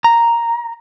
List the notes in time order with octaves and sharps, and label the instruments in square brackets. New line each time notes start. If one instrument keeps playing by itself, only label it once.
[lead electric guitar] A#5